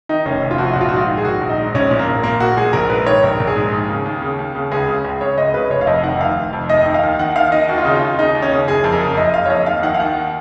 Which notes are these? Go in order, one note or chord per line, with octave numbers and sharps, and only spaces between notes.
D#3 D#4
F1 C#4
F1
F4
F2 F#4
F4
A#1 F#4
F4
F#4
G#2 F4
D#3
G#4
A#1 F#4
A#1
D#4
G#2
A#1 C#4
A#2
A#3
A#1
A#2 A#3
A#1 F#4
A#2 G#4
A#1 A#4
G#2 B4
D#3 C#5
A#1 A#4
A#1
G#4
G#2
D#2
C#3
D#2
C#3
D#2
C#3
C#2 G#4
C#3
C#2
C#3 C#5
C#2 D#5
C#3 B4
F1 C#5
F5
F2 D#5
D#3 F#5
F1 F5
F1
F2
D#2 D#5
D#3
F5
D#2
D#3 F#5
D#2 F5
D#3 D#5
D#2 F#4
F4
C#3 D#4
F4
D#2
C#3 D#4
D#2
C#4
C#3
F#1 G#4
F2 G#4
A#4
C#3
F#1 D#5
F#1 F5
C#5
F2 D#5
D#2 F5
D#3 F#5
F5
D#2 F#5
D#3